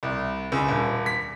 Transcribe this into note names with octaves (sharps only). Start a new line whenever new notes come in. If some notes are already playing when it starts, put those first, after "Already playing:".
C2
C#2
D#1
B6